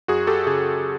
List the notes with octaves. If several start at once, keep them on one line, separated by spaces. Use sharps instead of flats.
F#2 F#4 G#4
G4 A4
C#3 G#4